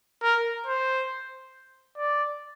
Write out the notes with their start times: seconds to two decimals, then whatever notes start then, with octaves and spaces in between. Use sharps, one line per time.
0.22 A#4
0.66 C5
1.97 D5